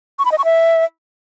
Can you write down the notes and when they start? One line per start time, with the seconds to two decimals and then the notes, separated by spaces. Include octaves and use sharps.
0.19 C#6
0.25 B5
0.32 D#5
0.38 C#6
0.45 E5